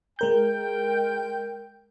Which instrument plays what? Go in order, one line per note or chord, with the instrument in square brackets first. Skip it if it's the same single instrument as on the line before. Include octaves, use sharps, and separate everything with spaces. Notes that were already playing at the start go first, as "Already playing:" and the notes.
[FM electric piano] G#3 A#4 G6 [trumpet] G5